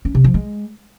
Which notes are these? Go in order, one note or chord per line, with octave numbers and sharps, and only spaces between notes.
C#4
C3
F3
G#3